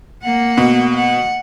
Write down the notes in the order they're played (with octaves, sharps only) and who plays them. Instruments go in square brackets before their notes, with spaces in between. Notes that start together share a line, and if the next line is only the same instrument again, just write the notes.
[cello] A#3 F#5
[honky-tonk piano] B2
[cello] F#5